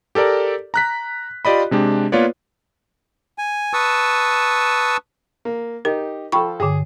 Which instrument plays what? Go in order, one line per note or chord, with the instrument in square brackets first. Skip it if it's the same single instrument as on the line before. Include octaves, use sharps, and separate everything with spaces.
[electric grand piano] G4 A4 A#4 D5 A#5
A#5 F#6 B6
F4 G4 D5 D#5 B5
C3 G#3 D4 G4
A#3 B3 F4 B4 C#5 D5
[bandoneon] G#5
B4 A5 C#6 D#6 E6
[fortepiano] A#3
[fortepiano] D#4 G4 [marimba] A#4
[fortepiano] F3 A4 [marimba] G5 B5 C#6
[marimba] G2 D3 [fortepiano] G#4